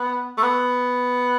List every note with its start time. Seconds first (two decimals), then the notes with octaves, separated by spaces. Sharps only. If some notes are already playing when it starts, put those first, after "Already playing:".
Already playing: B3
0.38 A3
0.43 B3